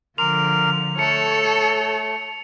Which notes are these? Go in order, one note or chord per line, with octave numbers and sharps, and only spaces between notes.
D3 F3 A#4 C6 D6 F7
A3 A4 C#5 C#7
A3